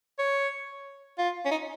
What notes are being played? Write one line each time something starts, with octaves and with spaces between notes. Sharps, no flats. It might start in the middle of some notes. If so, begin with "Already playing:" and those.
C#5
F4
C#4
D#4